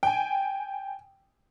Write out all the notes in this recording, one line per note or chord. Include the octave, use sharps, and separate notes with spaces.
G5 G#5